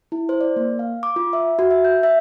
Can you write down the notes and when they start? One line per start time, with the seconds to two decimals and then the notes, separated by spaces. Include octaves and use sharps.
0.12 E4
0.29 C5
0.41 D5
0.56 A#3
0.79 F5
1.03 D6
1.16 F4
1.33 E5
1.59 F#4
1.71 E5
1.84 G6
2.03 E5